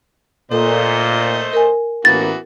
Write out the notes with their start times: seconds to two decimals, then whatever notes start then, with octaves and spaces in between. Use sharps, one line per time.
0.52 A#2 A3 A4 C5 D#5
1.53 A#4 G#5
2.05 A1 E3 A#3 B3 F#4 A6